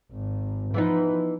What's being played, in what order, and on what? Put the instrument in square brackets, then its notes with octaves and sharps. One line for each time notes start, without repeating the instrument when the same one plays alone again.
[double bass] G#1
[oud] E3 B3 D#4 [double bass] F3